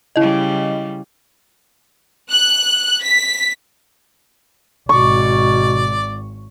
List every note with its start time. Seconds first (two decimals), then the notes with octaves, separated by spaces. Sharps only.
0.16 C#3 G3 E4 D#5
2.29 F#6
3.02 B6
4.89 G#1 B2 D5 C#6